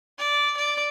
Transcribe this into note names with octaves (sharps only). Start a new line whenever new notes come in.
D5
D5